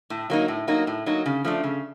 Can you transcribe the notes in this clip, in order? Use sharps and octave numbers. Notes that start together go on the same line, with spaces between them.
A2
F#3 A#3 D#4
A2
F#3 A#3 D#4
A2
F#3 A#3 D#4
C#3
F3 A3 D4
C#3